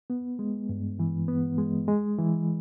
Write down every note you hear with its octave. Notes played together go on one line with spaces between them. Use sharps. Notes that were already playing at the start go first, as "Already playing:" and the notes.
B3
G#3
G2
E3
B3
G#3
G#3
E3